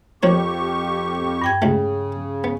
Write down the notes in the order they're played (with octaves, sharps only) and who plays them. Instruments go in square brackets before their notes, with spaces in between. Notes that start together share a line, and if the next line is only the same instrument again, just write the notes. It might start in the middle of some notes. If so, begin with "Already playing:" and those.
[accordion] F2 G4 C#6 [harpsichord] F3 A#3 C#5
[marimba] G2 G5 G#6
[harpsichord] C#2 A3 [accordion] C#3
[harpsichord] B3